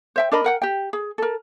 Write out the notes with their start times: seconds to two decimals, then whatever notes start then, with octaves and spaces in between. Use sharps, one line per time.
0.16 C5 E5 G5
0.32 D4 A#4 D#5 B5
0.44 A#4 F#5 G5
0.62 G4 G5
0.93 G#4
1.18 A4 A#4